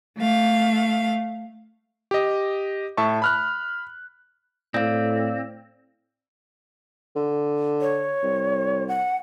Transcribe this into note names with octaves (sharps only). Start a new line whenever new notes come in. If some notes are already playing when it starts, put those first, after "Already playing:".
A3 F5
G4 D#5
A2 E5 A5 C#6
B5 F6 F#6
A2 C4 D5 F5
D3
C#5
C2
F#5